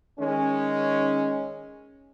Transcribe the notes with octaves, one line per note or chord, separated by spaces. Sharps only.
D#3 G#3 C#4